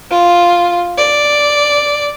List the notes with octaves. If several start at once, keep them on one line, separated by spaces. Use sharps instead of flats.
F4
D5